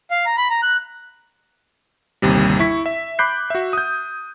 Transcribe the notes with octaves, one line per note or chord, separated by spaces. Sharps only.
F5
A#5
B5
A#5
F#6
G1 D#2 C3 G3
E4 C#6 B6
E5
B5 D6 F#6 G6 C7
F#4 E5
D#6 G6